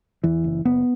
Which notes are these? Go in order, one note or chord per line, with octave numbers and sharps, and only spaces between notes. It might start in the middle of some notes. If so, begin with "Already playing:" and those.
E2 E3
F#1
F#1 B3